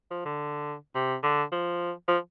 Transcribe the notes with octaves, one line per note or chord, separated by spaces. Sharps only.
F3
D3
C3
D3
F3
F3